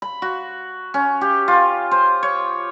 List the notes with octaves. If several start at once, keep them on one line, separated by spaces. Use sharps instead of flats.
B5
F#4
C#4
G4
F4
C5
C#5